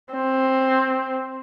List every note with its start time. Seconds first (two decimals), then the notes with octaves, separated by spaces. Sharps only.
0.13 C4